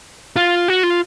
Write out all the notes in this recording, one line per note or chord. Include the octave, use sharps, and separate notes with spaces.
F4
F#4
F4